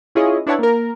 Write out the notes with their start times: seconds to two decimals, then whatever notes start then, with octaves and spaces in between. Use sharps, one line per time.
0.15 C#4 E4 F4 G#4 C#5 D#5
0.47 D4 E4 B4 C#5 F#5 A5
0.59 A#3 A#4